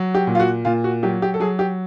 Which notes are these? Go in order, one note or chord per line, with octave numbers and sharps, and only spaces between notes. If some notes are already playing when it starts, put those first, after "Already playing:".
Already playing: F#3
G4
A#2
F4
F#4
A#2 F4
F#4
F#3 G4
G4
A4
F#3 G#4
G4